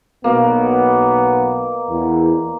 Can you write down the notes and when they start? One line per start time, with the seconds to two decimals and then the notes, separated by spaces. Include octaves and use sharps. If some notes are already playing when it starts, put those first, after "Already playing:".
0.24 B1 B2 A#3 B3
1.90 E2